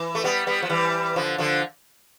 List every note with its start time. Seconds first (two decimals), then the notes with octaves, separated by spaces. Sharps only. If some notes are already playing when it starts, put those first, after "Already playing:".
Already playing: E3
0.15 A3
0.24 G3 B3
0.47 G3 B3
0.62 F3
0.69 E3 G3
1.16 D3 F3
1.38 D3 F3